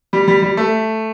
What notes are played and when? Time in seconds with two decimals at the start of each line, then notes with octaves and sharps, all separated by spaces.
0.13 G3
0.28 G3
0.42 G3
0.57 A3